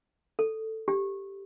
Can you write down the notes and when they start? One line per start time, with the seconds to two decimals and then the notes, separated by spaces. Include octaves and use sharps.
0.39 A4
0.88 G4